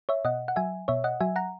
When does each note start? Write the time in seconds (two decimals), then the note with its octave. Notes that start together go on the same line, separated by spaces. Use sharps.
0.09 C#5 E5
0.25 B2 D#5 F#5
0.48 F#5
0.56 F#3 E5 G#5
0.88 B2 C#5 E5
1.04 D#5 F#5
1.20 F#3 E5 G#5
1.36 F#5 A#5